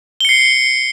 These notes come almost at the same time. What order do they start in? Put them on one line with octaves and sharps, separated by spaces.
G7 C#7 C7